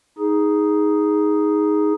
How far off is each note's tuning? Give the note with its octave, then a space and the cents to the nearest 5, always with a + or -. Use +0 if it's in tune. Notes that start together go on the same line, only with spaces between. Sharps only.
D#4 +10 G#4 +0